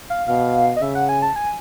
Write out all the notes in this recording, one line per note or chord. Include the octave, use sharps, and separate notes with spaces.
F5
B2 F5
D#5
C#3 E5
F#5
G#5
A5
G#5